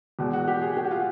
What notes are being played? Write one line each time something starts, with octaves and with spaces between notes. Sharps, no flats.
E2 B2 G#3
F#4
G4
G#4
G4
F#4
F4